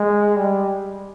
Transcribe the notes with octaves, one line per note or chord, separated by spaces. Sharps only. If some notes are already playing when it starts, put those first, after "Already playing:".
Already playing: G#3
G3